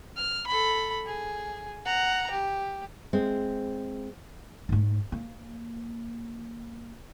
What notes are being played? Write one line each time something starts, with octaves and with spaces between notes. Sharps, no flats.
F6
A4 B5
G#4
F#5 A#5
G4
G#3 C4
G#2 A3
A#3